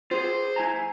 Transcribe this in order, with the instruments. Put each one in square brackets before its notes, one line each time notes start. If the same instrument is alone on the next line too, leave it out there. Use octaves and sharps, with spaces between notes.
[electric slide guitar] F4 G#4 [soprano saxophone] C5
[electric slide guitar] E4 G#5 A#5